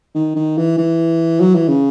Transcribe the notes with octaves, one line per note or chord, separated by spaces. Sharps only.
D#3
D#3
E3
E3
F#3
E3
C#3